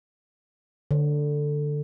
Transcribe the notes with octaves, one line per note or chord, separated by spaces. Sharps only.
D3